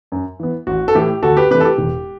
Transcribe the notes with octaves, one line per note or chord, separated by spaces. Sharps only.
F#2
E3 B3
A1 F#4
A4
A2 E3 A3 G4
D2 F#4 A4
G4 B4
C3 E3 A3 D4 G4 B4
A4
G4
E1